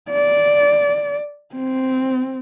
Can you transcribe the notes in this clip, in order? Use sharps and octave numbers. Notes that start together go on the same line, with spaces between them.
D5
C4